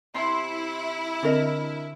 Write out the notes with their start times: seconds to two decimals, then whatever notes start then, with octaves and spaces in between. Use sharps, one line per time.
0.14 C3 E4 C6
1.23 D3 C4 D4 A#4 D#5